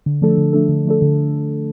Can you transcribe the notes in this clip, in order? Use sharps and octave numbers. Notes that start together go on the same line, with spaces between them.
D3
F3 A3 D4 A4
D3
F3 A3 D4 A4
D3
F3 A3 D4 A4
D3